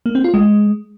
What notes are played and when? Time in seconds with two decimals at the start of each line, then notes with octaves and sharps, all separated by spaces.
0.06 A#3
0.15 C4
0.24 F4
0.34 G#3